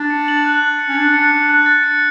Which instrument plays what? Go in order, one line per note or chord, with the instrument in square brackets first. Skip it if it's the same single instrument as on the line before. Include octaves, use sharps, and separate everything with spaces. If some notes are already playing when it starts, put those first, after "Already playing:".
Already playing: [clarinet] D4 [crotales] A6
[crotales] C#7
F#7
F#6
A6
C#7
[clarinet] C#4
[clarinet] D4 [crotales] A6
[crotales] C#7
F#6
F#6
A6
C#7